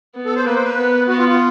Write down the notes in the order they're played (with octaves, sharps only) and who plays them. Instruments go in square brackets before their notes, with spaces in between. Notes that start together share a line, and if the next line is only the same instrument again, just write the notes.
[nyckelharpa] B3
[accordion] A4
C5
[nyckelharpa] A#3 [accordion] B4
[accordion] C5
B4
[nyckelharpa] B3
[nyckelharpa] B3 [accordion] F#4
[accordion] F4
F4